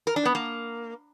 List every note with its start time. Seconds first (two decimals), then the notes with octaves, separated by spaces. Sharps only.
0.07 A#4
0.16 D4
0.25 B3
0.35 A#3